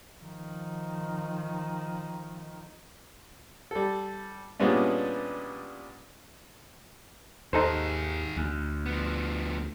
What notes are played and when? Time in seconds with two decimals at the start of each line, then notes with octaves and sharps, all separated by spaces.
0.21 D#3 F3
3.71 G3 A4
4.60 A#2 G3 G#3 B3 C#4 D4
7.53 D#2 D#3 D#4 G#4 A4 C5
8.36 D2
8.86 F3 B3